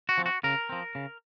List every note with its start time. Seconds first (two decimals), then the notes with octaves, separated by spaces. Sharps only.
0.09 F#4
0.18 F3 C4
0.26 F#4
0.44 C#3 A#4
0.69 F3 C4
0.95 C#3